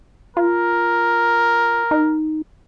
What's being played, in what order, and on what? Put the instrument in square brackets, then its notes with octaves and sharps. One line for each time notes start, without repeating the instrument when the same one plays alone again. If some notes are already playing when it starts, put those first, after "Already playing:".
[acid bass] F4 [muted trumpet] A#4
[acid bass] D#4